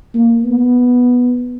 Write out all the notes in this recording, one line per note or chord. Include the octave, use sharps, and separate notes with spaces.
A#3
B3